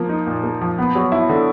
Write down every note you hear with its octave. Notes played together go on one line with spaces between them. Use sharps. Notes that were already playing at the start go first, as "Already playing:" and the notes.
Already playing: F3 A#3
D#4
A#2
A#3
F3
B3
F#3
E4
D3